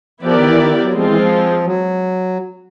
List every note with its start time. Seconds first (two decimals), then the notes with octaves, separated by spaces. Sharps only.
0.22 F3 B3 E4 G4 A#4 D5
0.34 D#3
0.46 E3
0.58 D#3
0.82 F#3
0.93 F3 G#3 C4 F4 G#4
1.05 E3
1.16 F3
1.64 F#3